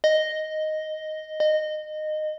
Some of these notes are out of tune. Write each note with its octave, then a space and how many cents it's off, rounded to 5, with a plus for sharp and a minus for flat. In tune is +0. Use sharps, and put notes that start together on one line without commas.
D#5 +0
D#5 -20